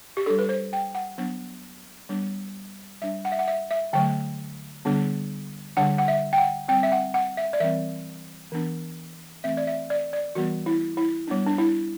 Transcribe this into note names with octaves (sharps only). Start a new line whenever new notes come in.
G4
G3 D4 A4
B4
C5
G5
F#5
F#3 B3 D4
G3 B3 D4
G3 D4 E5
F#5
E5
F#5
E5
E5
D3 F#3 A3 G5
D3 G3 B3 D4
D3 G3 D4 F#5
F#5
E5
G5
F#5
G3 C4 G5
E5
F#5
F#5
E5
D5
E3 G3 C4 E5
E3 B3 D4
E3 A3 C4 E5
D5
E5
D5
D5
E3 G3 B3 F#4
E4
E4
G3 B3 D4
D4
E4